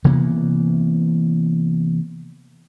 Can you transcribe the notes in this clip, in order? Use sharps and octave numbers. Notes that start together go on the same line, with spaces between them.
C3 E3 A#3 B3